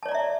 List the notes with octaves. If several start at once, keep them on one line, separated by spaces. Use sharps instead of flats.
C#5 D5 E5 A5 A#5